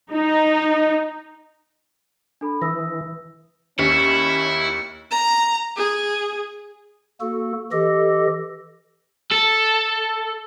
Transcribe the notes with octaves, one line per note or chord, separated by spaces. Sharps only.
D#4
D4 A4 B5
E3 D#6 E6 A#6
D#2 C#4 E4 E5 C#7
A#5
G#4
A#3 F#4 A4
E3 G4 A4 D#5
A4